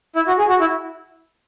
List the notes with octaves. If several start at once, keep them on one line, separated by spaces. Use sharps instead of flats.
E4
F#4
G#4
F#4
E4